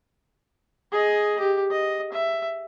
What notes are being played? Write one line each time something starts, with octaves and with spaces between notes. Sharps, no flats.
G#4 D#5
G4
D#5
E5